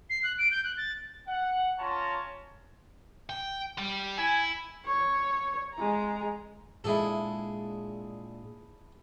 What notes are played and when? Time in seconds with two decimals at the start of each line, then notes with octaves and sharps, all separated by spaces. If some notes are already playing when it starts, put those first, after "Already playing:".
0.10 C7
0.23 F#6
0.39 D7
0.51 G6
0.64 F#6
0.77 A6
1.27 F#5
1.79 C#4 F4 C#5 A5 A#5
3.30 G5
3.78 G3
4.18 E4 G#5
4.85 C#5
5.74 G#3 A#5
6.84 A#2 G#3 D4 E4 G#4 A4